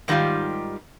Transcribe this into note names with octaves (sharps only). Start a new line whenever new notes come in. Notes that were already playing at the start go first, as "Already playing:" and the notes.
G#2 D#3 G3 D#4 F4 G4